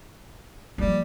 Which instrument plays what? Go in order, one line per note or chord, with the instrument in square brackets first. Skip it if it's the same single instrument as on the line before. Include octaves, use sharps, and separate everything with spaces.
[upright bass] F3 A#3 [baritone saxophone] G3